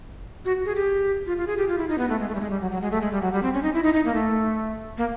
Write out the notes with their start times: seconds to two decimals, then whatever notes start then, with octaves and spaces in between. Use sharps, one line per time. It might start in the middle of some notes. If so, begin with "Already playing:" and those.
0.45 F#4
0.66 G#4
0.75 G4
1.26 F4
1.37 F4
1.47 G#4
1.57 G4
1.69 F4
1.78 E4
1.89 D#4
1.98 B3
2.09 A3
2.19 G#3
2.29 A3
2.35 G3
2.41 G#3
2.50 G3
2.61 F#3
2.71 F#3
2.82 G#3
2.91 A3
3.01 G#3
3.12 G3
3.22 F#3
3.33 G3
3.43 C4
3.54 C#4
3.63 D#4
3.74 E4
3.83 D#4
3.94 D#4
4.05 A#3
4.14 A3
4.98 A#3